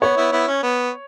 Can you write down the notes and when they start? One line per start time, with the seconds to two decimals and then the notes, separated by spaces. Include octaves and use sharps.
0.02 B3 C#5
0.17 B3 E4
0.32 B3 E4
0.48 C#4
0.63 B3